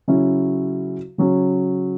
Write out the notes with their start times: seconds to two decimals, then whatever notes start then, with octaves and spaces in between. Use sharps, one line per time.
0.08 C#3 F#3 C#4 E4
1.18 C#3 F#3 C#4